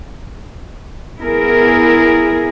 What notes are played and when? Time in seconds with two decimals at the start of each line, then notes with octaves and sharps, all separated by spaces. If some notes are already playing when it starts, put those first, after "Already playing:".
1.19 B3 E4 G#4 A#4